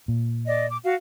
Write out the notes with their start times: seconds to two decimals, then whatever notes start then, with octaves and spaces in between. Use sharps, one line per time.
0.08 A#2
0.46 D5 D#5
0.70 D6
0.84 F#4 F5